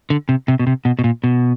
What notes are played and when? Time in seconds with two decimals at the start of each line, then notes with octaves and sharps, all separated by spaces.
0.10 D3
0.29 C3
0.48 C3
0.59 B2
0.67 C3
0.85 B2
0.99 B2
1.04 A#2
1.24 B2